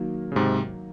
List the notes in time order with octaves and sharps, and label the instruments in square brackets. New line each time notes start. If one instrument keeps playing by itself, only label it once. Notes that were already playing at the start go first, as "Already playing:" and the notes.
Already playing: [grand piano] D#3 F#3 A#3
[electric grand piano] C#3
G#2 C3